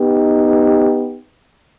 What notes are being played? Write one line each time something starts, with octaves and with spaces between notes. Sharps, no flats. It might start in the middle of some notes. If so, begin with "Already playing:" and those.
Already playing: B3 D#4 G4